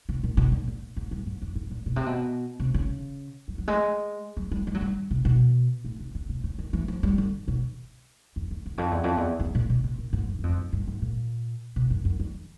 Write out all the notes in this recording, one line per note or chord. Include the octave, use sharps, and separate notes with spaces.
C3
A#2
B2
A#2
A#2
G#2
G2
G#2
F2
A2
A#2
B2
C3
B2
C3
C#3
F#3
F#3
G#3
F#3
G3
G#3
F#3
G3
C3
B2
A2
C3
D3
C3
C#3
D#3
E3
F3
G3
D3
B2
F2
F2
E2
F2
E2
F2
E2
E2
A#2
B2
C3
A#2
G#2
F#2
F#2
F2
F#2
G2
G#2
A#2
B2
F#2
F#2
F2